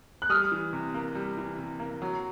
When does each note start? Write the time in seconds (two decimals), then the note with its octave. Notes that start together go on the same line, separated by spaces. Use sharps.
0.22 F#6
0.30 G3 D#6 F6
0.52 E3
0.73 C3
0.94 A#3
1.15 G3
1.37 E3
1.58 C3
1.80 A#3
2.02 F#3